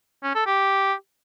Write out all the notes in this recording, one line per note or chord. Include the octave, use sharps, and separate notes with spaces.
C#4
A4
G4